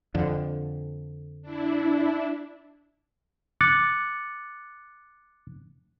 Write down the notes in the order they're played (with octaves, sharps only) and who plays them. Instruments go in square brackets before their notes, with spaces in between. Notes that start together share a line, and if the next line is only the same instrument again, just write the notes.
[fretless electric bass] F2 D3
[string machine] D4 E4
[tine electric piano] D6 F#6 A6 C#7